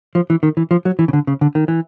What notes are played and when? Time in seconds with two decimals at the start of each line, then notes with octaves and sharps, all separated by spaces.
0.15 F3
0.30 E3
0.43 D#3
0.57 E3
0.71 F3
0.85 F#3
0.99 E3
1.08 C#3
1.13 D3
1.27 C#3
1.41 D3
1.55 D#3
1.68 E3